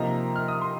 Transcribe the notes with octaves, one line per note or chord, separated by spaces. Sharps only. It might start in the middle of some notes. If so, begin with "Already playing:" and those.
Already playing: C3 F3 A#3 D#4 A#5
F6
D#6
C6